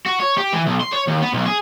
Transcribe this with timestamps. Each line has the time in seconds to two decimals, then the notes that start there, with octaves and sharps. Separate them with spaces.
0.06 F#4
0.20 C#5
0.37 G4
0.52 E3
0.66 B1
0.81 C6
0.92 C#5
1.07 D#2
1.22 B3
1.34 B1
1.46 G#4